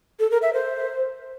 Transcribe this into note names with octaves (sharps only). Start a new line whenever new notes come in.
A4
A#4
E5
C5